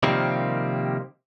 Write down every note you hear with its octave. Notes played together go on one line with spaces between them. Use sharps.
C3 D#3 F3 G3 A#3 C4